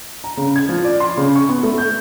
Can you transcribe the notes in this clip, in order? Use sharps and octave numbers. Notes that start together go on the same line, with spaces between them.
A#5
C#3
G#6
F3
D5
C6
C#3
C#6
B3
A3
G6